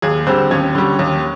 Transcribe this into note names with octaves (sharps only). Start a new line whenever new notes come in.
D#2 G#4
D3 G3 C4 C5
D#2 C#4 C#5
D3 G3
D#2